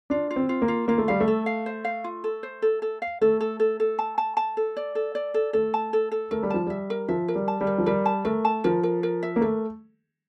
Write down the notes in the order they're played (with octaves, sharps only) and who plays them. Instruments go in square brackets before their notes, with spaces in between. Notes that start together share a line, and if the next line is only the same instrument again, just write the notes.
[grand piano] D4 [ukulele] F4
[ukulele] F4
[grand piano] C4
[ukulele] F4
[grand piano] A#3
[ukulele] F4
[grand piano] A#3 [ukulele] F4
[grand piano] A3
[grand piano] G3 [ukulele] F5
[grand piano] A3
[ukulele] A4
F5
C5
F5
F4
A4
C5
A4
A4
F5
[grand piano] A3 [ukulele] A4
[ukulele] A4
A4
A4
A5
A5
A5
A4
D5
A4
D5
A4
[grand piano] A3 [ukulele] A4
[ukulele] A5
A4
A4
[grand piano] A3 [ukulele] A#4
[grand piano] G3
[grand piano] F3 [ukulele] A5
[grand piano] G3 [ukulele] E5
[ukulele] A#4
[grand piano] F3 [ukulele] E5
[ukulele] A#4
[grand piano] G3
[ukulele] A5
[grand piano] G3
[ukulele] A#4
[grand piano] F3
[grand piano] G3 [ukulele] A#4
[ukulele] A5
[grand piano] A3 [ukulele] A#4
[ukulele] A5
[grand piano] F3 [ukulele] A#4
[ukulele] A#4
A#4
E5
[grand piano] A#3
[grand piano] A3 [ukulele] A#4